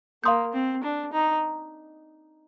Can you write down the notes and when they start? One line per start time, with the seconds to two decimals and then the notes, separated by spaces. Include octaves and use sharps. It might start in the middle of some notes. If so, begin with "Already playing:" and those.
0.23 A#3 F5 C6 D#6 G6
0.53 C4
0.83 D4
1.13 D#4